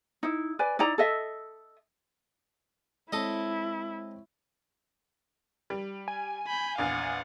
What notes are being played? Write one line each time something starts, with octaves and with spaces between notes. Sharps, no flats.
D#4 E4
B4 D5 G#5
D#4 E4 D5 A#5
A4 D#5 E5
G#3 C4 E4 A4 C#5 D#5
G3
G#5
B5 G6
A#1 E2 F5 F#5